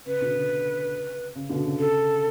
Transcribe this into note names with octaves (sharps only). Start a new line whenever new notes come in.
C#3 B4
B2 D3
C#3
C#3
B2 D3
C#3
C#3 A4